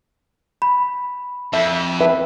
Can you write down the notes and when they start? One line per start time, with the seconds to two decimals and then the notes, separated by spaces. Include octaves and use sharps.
0.62 B5
1.53 F2 E5
2.01 B4 E5